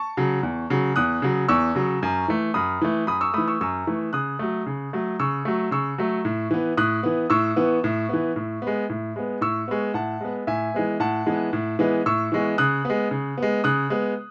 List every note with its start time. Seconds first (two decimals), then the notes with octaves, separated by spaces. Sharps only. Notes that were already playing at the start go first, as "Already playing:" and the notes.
Already playing: A5 C#6
0.17 C#3 F#3
0.43 E2
0.70 C#3 F#3
0.96 E2 D#6 F#6
1.22 C#3 F#3
1.48 E2 C#6 E6
1.75 C#3 F#3
2.03 F#2
2.28 E3 A3
2.54 F#2 B5 D#6
2.82 E3 A3
3.07 F#2 B5 D#6
3.21 C#6 E6
3.34 E3 A3 B5 D#6
3.48 C#6 E6
3.61 F#2 C#6 E6
3.87 E3 A3
4.13 C#3 D#6 F#6
4.39 F#3 A3
4.66 C#3
4.93 F#3 A3
5.20 C#3 C#6 E6
5.45 F#3 A3
5.71 C#3 C#6 E6
5.98 F#3 A3
6.25 A2
6.51 E3 B3
6.77 A2 D#6 F#6
7.03 E3 B3
7.30 A2 C#6 E6
7.56 E3 B3
7.84 A2
8.09 E3 B3
8.36 A2
8.62 B3
8.67 G#3
8.89 A2
9.16 G#3 B3
9.41 A2 C#6 E6
9.68 G#3 B3
9.94 A2 F#5 A5
10.21 G#3 B3
10.47 A2 E5 G#5
10.74 E3 G#3 B3
11.00 A2 F#5 A5
11.26 E3 G#3 B3
11.53 A2
11.79 E3 G#3 B3
12.06 A2 C#6 E6
12.32 E3 G#3 B3
12.58 C#3 D#6 F#6
12.85 G#3 B3
13.11 C#3
13.38 G#3 B3
13.64 C#3 D#6 F#6
13.90 G#3 B3